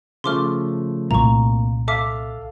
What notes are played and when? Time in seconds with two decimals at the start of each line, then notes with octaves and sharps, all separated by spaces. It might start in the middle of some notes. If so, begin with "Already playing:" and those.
0.24 C#3 F3 A3 C6 D6 F6
1.11 C2 A#2 A3 A#3 A#5 C#6
1.88 A4 E5 F5 D6 B6